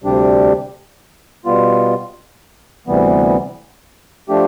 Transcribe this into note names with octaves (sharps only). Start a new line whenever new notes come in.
D2 C3 G3 D4 G4
B2 G3 B3 F4
D2 C3 E3 G3 B3
F3 A3 D4 G4